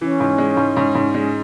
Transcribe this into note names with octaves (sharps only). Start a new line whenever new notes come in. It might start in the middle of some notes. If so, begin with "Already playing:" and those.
E3 C#4
G#2
G#3
G#2
G#2
G#2
G#3